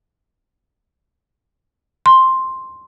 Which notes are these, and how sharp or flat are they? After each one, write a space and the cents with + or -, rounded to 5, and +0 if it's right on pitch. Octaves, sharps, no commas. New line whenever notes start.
C6 +5